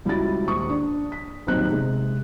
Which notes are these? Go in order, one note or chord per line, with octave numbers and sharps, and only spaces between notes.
C#2 G3 E4 F#4 A6
D#1 C#6 D#6
D4
B6
D#1 B1 C4 D#4 F#6
C3 G#3